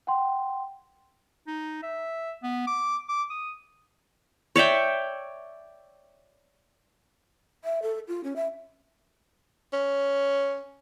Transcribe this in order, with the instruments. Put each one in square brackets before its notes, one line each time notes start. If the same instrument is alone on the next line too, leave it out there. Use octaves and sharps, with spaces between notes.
[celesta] F#5 G5 C6
[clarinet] D#4
E5
B3
D6
D6
D#6
[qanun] C#5 D5 E5 G5
[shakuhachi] E5
A4
F4
C#4
E5
[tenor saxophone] C#4